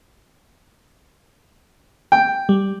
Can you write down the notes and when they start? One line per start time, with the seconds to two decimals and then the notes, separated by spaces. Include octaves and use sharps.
2.12 G5
2.49 G3